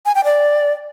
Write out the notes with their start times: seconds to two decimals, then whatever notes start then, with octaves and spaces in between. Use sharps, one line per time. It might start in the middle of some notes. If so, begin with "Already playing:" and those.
0.06 G#5
0.15 G5
0.24 D5